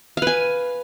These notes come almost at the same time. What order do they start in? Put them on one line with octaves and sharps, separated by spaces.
F5 B4 G#5